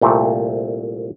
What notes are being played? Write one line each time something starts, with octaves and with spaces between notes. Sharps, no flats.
C2 A#2 A3 C4